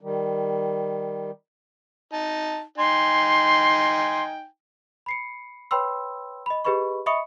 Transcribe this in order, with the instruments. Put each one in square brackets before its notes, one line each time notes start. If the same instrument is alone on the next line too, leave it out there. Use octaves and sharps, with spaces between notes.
[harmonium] D#3 G3
[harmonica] D#4 A5
[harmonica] D#4 G5 G#5 [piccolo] C6
[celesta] B5 C7 C#7
B4 C#5 G5 B5 C6 E6
D#5 B5
G4 G#4 B4 D#5 B5 C#6
D#5 E5 B5 C#6 D#6 C#7